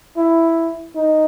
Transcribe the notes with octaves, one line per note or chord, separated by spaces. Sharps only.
E4
D#4